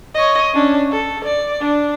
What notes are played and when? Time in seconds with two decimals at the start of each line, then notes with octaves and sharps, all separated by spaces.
0.14 C#5 D#5
0.54 C#4 D4
0.92 A4
1.24 D5
1.61 D4